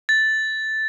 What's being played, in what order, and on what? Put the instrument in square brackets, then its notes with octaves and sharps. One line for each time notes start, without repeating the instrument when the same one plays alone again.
[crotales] A6